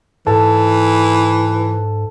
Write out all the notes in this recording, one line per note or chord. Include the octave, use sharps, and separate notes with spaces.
G#2 E3 A4 A5